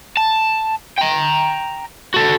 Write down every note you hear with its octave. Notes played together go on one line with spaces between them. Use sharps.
A5
G5 A#5
F#4 A4